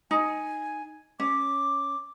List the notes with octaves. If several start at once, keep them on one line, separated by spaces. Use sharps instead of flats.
D#4 G#5
C#4 D6